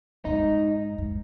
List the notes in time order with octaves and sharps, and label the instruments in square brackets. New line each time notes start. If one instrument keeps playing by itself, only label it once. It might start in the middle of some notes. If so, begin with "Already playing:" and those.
[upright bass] G#2 [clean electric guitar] D#4
[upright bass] G#2